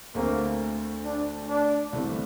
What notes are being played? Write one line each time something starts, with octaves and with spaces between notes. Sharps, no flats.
D2 D3 A3 A#3 C4
D4
D4
C2 C3 E3 A3